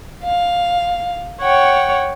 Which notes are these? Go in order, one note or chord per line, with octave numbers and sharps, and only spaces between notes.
F5
C#5 F#5 G5